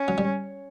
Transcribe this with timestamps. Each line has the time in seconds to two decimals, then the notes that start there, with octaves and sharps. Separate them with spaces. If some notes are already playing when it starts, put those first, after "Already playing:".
Already playing: C#4
0.08 F#3
0.18 G3